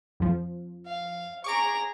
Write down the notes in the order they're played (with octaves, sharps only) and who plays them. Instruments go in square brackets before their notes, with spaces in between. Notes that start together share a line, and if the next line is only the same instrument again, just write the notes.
[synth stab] F2 F3
[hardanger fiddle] F5
[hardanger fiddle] G#4 A#5 [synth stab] C#6 D6 D7